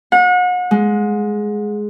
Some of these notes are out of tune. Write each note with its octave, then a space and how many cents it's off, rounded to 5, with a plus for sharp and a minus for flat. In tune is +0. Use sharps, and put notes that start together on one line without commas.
F#5 -35
G#3 +10